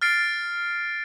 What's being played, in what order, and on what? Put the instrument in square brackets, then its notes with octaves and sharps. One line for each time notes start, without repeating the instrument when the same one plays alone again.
[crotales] F6 A6 C7 D7